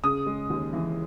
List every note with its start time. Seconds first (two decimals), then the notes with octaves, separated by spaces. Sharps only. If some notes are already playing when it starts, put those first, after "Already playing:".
0.04 C#3 D#6
0.26 G#3
0.50 D#2
0.73 E3